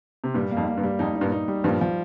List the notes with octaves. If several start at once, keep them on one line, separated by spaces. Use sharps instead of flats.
C3
G2 A#2 G3
A#3
F2 G#2
A#3
G2
G3
F2 G#2 D#4
D#4
G2 A#2
D#4
G3
G2 A#2 F3
F3